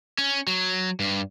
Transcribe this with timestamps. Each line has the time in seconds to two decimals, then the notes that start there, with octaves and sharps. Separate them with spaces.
0.18 C#4
0.47 F#3
1.00 G2